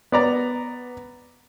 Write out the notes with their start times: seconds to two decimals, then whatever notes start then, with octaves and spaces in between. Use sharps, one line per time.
0.12 B3 D5 A#5